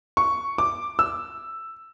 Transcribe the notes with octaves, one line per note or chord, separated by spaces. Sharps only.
C#6
D6
E6